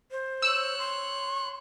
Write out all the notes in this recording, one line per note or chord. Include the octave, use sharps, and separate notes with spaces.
C5
C#5 E6 F#6
C6